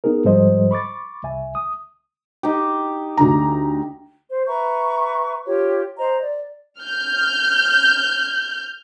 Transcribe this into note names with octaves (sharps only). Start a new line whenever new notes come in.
B3 D#4 G#4 A#4
G#2 F3 G3 A4 C5 D#5
B5 C#6 D6 A6
C2 E5 G#5
D#6
D#4 G4
D2 D3 A#5
C5
B4 E5 A#5 C#6
F4 G4 C#5
C5 D#5 A#5
D5
F6 G6